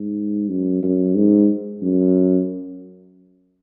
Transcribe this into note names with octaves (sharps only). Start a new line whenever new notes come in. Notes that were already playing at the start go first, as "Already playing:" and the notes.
Already playing: G#2
F#2
F#2
G#2
F#2